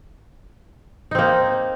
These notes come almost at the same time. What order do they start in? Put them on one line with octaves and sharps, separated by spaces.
D#4 C4 A#3